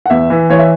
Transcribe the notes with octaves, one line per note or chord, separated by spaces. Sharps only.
F#5
E2 E5
E3
E3 C#5
E5